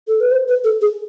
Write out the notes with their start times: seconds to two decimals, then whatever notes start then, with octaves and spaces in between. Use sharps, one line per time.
0.08 A4
0.20 B4
0.31 C5
0.48 B4
0.64 A4
0.81 G#4